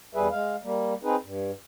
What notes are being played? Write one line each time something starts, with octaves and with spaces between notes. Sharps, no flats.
E2 G3 G#4 B4 E5
G#3 F5
G3 A#3
C4 D#4 G#4 B4
G2